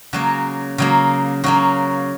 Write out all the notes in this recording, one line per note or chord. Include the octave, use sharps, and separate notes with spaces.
C#3 F#3 A#3 F#4
C#3 F#3 A#3
C#3 F#3 A#3 F#4